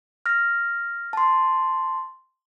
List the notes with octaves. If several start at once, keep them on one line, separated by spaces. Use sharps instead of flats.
F6 A#6
A5 C6